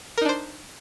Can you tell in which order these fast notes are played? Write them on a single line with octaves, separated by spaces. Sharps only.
A#4 D#4 D4 C5